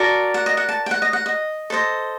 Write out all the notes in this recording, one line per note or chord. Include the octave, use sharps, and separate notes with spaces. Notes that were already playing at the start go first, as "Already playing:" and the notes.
Already playing: F#4 A#4 D5 A5
F#5
D#5
F#5
A5
G5
F#5
D#5
F#5
D#5
A4 C5 D#5